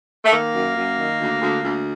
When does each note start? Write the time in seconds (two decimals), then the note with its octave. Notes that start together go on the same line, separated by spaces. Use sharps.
0.25 A3
0.32 D#3 A#3
0.54 F#2
0.75 F#2
0.98 D#3
1.20 D2
1.42 D2
1.63 D2